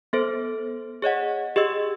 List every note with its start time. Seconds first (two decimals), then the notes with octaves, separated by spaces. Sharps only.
0.13 B3 A4 C5
1.02 G#4 C#5 D#5 F#5
1.56 G4 G#4 D#5 E6